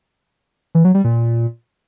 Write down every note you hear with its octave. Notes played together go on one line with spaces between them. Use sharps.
E3
F#3
G3
A#2